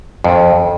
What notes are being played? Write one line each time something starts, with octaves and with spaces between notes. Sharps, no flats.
F2